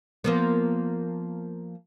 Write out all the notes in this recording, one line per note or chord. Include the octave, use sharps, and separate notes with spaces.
F3 A#3 B3